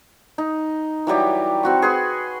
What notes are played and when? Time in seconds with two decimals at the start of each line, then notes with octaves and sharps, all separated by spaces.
0.38 D#4
1.07 E3 F#3 G3 G4
1.63 C4 F#4 C#6
1.82 G#4 B4 C6 C#6